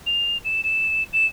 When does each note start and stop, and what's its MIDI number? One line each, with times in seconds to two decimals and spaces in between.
0.06 0.37 101
0.44 0.61 100
0.63 1.03 100
1.13 1.26 100